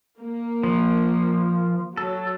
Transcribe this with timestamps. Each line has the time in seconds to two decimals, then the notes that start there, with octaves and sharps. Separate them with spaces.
0.19 A#3
0.63 F3
1.97 F#3 A4